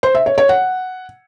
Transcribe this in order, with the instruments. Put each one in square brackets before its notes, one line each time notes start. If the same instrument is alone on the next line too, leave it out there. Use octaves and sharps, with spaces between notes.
[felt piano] C5
E5
C#5
C#5
F#5